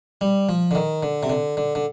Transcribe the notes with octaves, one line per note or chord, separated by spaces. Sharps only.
G3
F3
D3
D#3
D3
C3
D3
D3
D3